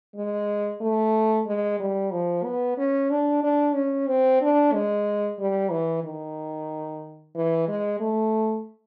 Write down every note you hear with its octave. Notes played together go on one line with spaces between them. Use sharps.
G#3
A3
G#3
G3
F3
B3
C#4
D4
D4
C#4
C4
D4
G#3
G3
E3
D#3
E3
G#3
A3